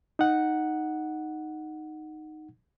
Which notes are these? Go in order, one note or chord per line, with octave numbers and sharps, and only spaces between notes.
D#4 F#5